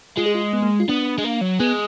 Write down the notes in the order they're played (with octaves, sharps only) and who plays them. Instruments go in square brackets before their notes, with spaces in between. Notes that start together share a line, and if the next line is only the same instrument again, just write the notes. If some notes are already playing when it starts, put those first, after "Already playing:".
[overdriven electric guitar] G#3 [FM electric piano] F4
[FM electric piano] G#4
F4
B3
A#3
F4
[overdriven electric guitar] B3 [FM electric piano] D4
[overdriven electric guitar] G#3
A#3
F#3
[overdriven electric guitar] G#3 [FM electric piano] B3